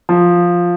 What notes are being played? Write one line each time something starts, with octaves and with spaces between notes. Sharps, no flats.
F3